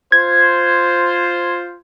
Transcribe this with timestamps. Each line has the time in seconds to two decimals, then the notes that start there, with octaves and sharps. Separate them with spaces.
0.12 F4 C5 G#6